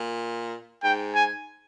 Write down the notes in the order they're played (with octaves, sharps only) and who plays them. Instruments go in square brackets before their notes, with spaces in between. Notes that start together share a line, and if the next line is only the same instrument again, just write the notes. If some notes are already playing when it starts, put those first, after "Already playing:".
Already playing: [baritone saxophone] A#2
[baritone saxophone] G#2 [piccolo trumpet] G5
[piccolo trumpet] G#5